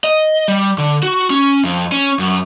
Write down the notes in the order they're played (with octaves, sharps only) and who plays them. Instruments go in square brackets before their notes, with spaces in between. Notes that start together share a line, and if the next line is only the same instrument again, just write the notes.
[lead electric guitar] D#5
G3
D3
F#4
C#4
F2
C#4
F#2